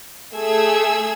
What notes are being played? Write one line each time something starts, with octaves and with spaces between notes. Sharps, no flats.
A3 G#4 E6 G#6